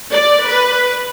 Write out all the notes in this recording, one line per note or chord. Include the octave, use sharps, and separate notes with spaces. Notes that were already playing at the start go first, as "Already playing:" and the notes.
D5
B4